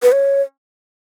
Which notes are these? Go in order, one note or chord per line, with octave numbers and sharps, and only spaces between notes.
B4
C#5